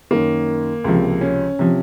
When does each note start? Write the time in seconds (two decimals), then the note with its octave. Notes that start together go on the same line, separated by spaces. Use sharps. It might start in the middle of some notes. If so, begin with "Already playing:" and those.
0.11 F#2 D#3 A#3
0.84 C#2 C3 F3
1.21 C#4
1.59 C3 F3